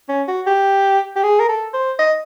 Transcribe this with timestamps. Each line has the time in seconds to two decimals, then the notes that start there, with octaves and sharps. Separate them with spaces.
0.09 C#4
0.28 F#4
0.47 G4
1.16 G4
1.24 G#4
1.40 A#4
1.49 A4
1.74 C5
1.99 D#5